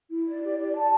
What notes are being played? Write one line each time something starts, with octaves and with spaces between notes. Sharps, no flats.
E4
D5
G4
D5
A5